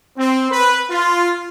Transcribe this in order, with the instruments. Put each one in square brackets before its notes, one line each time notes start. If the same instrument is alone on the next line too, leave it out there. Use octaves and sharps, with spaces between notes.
[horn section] C4
B4
F4